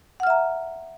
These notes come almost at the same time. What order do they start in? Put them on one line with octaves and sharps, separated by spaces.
F#5 F6 E5 A#5